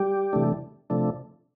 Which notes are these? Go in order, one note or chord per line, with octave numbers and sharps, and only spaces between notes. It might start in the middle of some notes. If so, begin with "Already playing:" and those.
Already playing: G3 G4
C3 E3 A3 D4
C3 F3 A3 D4